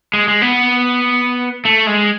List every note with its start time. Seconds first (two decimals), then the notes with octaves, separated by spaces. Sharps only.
0.13 G#3
0.28 G#3
0.42 B3
1.65 A3
1.87 G#3